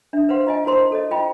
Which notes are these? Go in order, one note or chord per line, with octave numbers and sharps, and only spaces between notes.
D4 E5
B4 C5 F5 F#5 C6
F4 D#5 G#5
E4 F#4 A#4 C5 C6
F#4 A4 C#5 D#5
F4 D#5 G5 B5